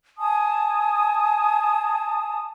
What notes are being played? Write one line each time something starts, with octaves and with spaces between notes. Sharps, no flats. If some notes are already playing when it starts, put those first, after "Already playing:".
G#5 A5 D#6